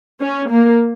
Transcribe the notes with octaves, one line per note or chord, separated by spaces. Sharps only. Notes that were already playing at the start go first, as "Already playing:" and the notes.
C#4
A#3